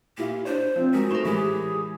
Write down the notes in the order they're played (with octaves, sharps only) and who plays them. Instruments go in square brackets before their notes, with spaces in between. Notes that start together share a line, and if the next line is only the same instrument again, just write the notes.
[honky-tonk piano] A#2 E4 F4 [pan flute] G4
[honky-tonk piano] D4 C#5 [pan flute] C5
[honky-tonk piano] F3 [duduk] C4
[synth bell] G#3 B6 [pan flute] F#4 [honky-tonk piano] A#4
[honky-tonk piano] G#2 C#6 E7 [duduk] A3 [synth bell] A#4 C5
[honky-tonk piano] A2 [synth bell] E3 G#3 [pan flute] G4 [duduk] G#4